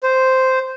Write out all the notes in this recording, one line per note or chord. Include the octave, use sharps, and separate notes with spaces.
C5